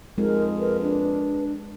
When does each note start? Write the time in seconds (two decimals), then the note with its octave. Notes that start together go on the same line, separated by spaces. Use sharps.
0.18 F2 G#3 D#4 A#4
0.59 A#4 B4
0.82 D4